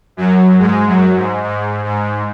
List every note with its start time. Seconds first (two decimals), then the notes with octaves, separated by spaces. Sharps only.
0.17 F#2 F#3
0.58 G#2 G#3
0.86 F#2 F#3
1.15 G#2
1.43 G#2
1.85 G#2